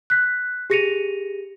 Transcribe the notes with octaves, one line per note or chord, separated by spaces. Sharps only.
F#6 B6
G4 G#4 A#6 C#7 D#7 F7